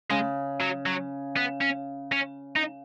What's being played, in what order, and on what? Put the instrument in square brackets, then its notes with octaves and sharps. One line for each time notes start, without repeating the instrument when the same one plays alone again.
[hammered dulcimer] C#3 [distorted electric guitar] G#3
[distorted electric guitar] F#3
F#3
B3
C#4
C#4
D#4